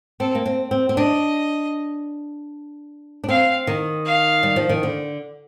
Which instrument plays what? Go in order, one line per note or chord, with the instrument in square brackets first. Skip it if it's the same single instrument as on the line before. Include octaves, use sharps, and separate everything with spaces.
[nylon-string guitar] C4 [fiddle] A4
[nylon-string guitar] A#3
C4
C4
C4
[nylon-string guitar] D4 [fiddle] D#5
[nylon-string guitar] D4
[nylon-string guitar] C4 [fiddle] F5
[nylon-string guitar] D#3
[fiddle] F5
[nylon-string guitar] G3
F3
D#3
D3